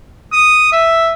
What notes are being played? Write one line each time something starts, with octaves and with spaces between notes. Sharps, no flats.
D#6
E5